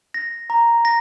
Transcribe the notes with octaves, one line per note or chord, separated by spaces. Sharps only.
A#6
A#5
A#6